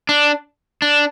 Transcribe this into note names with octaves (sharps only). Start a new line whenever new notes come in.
D4
D4